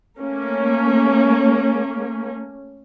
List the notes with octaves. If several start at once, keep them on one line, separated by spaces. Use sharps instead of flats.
A3 A#3 C#4